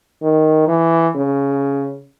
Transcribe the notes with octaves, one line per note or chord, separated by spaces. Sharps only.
D#3
E3
C#3